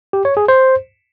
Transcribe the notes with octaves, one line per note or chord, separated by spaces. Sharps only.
G4
C#5
G#4
C5